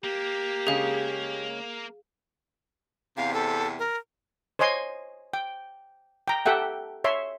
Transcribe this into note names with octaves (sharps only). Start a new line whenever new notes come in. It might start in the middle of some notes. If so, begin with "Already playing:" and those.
A#3 G4
C#3 G#3 C#4 G#4 F5
E2 C3 F5
A4
A#4
C5 C#5 D#5 G#5 C6
G5
G5 A#5
G4 A4 E5 F#5 G5
C#5 E5 C6